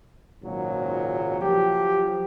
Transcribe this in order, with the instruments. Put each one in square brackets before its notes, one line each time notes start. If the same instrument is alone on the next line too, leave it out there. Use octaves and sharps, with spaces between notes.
[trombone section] G#1 C#2 A#2 F#3
F3 F#3 G4